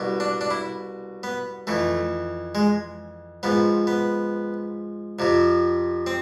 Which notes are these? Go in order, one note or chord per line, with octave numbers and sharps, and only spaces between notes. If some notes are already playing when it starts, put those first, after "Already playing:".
Already playing: C2 B2
D4
D4
E4
B3
F2 E3 A3
G#3
G#2 F3 B3
B3
F2 C3 F3
C4